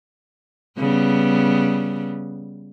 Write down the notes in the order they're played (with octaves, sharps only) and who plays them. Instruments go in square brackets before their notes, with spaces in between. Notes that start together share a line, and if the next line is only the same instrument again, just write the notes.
[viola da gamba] C#3 G3 B3